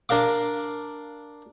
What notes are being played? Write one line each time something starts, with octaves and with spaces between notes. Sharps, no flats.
D4 A#4 F5 D6